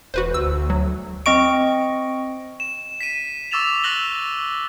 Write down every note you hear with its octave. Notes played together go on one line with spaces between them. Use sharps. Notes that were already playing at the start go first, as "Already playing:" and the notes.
E1 F#4 B4 C5
D2 E6
F#3
C4 D#5 C#6 D7
E7
B6 D#7
C#6 D6 E6 A6 E7 F7
C#6 E6 F#6 A#6 F#7 G7